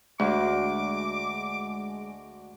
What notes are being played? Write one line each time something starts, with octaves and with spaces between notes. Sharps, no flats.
D2 G#3 D4 F#4 D6